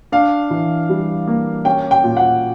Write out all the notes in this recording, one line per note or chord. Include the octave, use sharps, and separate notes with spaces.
D4 F5
E3
G3
A#3
C#4 G5
G5
A#2
F#5